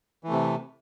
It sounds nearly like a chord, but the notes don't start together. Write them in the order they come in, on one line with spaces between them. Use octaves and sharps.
E3 A3 C3